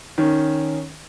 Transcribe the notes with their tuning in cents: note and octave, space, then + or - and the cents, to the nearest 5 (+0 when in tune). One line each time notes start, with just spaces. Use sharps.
D#3 +0 C#4 +0